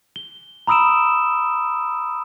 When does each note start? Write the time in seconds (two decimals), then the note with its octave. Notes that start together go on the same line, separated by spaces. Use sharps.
0.16 G7
0.67 A#5 B5 D#6 E6 D7 E7